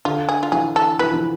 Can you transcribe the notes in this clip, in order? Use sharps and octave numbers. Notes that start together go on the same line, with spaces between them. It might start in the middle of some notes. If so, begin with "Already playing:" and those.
D3 F4
G#4
F4
E3 G#4
A4
E3 B4
F3
E3